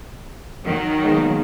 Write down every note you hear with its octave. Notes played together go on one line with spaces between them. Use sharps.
D#3 F#3
B2 G#3 A#3